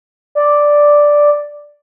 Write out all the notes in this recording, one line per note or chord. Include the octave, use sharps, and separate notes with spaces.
D5